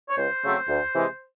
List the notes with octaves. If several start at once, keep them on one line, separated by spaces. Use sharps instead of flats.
C#5
C#2 C5
C#3 F#3 A3 C4
D2
C3 E3 G#3